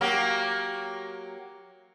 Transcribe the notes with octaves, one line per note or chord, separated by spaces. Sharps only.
F#3 A#3 G4